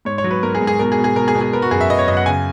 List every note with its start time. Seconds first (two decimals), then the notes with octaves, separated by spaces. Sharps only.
0.05 G#2 C#5
0.18 C#5
0.24 F#3
0.31 B4
0.43 G#2 A#4
0.55 G#4
0.61 G#2
0.67 G#4
0.79 B2 A#4
0.92 G#4
0.98 B2
1.04 G#4
1.16 B2 A#4
1.28 G#4
1.35 B2
1.41 G#4
1.53 B3 A#4
1.62 F#4
1.71 F#2 G#4
1.81 E5
1.89 B3 D#5
1.99 C#5
2.08 F#2 D#5
2.17 F#5
2.26 C#3 G#5